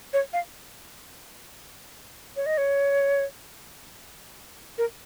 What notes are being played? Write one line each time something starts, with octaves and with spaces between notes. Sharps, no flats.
C#5
F5
C#5
D#5
C#5
A#4